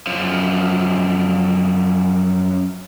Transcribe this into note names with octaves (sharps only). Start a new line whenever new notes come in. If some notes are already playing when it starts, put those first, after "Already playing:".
F#2 F3